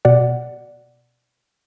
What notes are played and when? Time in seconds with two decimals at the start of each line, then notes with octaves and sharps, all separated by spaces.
0.05 B2 D5 F#5